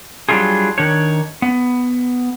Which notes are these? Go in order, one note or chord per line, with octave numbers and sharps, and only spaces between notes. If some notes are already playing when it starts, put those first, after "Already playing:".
F#3 G3 D4 E4 F4 G#4
D#3 D4 C#5
B3